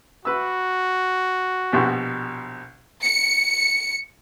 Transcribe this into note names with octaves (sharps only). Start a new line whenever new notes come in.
F#4 B4 E6
A#1 B2 G4
C#7